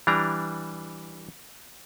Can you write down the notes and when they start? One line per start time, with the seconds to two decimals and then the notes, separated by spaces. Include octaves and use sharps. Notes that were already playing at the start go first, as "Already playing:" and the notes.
0.07 E3 G3 D4 A#5